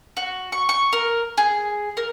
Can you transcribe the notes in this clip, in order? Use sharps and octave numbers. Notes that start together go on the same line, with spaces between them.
F#4
C#6
C#6
A#4
G#4
A#4